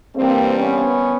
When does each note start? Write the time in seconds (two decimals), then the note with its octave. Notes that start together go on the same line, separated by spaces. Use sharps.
0.15 G2 E3 A#3 C4
0.59 B3 C#4